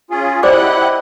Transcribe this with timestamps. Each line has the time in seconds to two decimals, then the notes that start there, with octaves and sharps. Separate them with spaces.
0.11 C#4 F4 G#4
0.43 E4 G4 C5 D5 D#5 F#5 D6 F#6